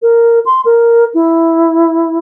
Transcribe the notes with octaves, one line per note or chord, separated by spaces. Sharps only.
A#4
C6
A#4
E4